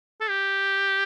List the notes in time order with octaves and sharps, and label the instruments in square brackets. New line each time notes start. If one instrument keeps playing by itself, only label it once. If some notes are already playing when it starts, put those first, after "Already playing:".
[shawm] A4
G4